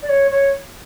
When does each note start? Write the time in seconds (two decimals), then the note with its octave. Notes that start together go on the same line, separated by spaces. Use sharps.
0.02 D5
0.09 C#5
0.31 C#5